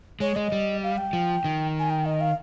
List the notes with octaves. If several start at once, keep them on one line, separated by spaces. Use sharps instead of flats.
G#3 C#5
G#3 D#5
G3
F5
G5
F3
D#3
G#5
G5
D#5
F5